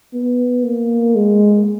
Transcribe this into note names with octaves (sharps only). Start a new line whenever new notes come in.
B3
A#3
G#3